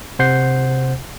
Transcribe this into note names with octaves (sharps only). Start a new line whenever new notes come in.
C3 C5 F#5 G6 C7